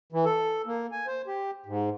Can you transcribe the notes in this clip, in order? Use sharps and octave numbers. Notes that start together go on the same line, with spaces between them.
E3
A4
A#3
G#5
C5
G4
G#2